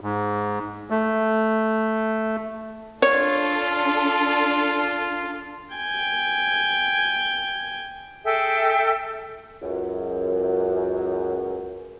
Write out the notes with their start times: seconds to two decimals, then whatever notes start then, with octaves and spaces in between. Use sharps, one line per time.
0.01 G#2
0.90 A3
3.02 D4 F4 A4 C#5
5.75 G5 G#5
8.24 G#4 A4 E5 G5
9.61 C#2 F#2